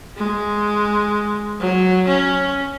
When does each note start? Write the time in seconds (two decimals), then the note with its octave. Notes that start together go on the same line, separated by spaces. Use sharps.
0.17 G#3
1.60 F#3
2.08 C#4